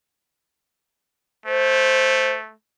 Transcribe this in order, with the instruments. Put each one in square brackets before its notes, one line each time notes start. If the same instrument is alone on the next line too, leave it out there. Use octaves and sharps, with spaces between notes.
[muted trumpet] A3 [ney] C5